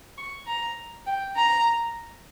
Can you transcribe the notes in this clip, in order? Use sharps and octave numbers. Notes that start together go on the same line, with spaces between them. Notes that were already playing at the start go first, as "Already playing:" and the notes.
C#6
A#5
G5
A#5